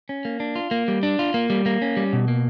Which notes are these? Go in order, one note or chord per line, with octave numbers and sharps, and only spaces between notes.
C#4
A#3
D4
F4
A#3
G3
D4
F4
A#3
G3
A#3
C#4
G3
B2
A#3